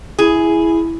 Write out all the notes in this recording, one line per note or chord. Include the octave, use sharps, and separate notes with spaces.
E4 G#4